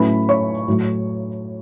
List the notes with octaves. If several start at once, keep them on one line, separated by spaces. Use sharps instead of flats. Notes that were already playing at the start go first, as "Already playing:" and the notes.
Already playing: A2 F#3 A3 C#4 E4 B4 B5
C#5 C#6
A2 F#3